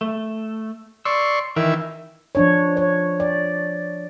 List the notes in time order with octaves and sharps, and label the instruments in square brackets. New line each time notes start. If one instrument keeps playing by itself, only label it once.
[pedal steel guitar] A3
[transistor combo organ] D5 C6 C#6 [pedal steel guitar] E6
[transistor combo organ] D#3 E3 E5 [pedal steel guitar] A#4
[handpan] F3 D4 C#5
C#5
D5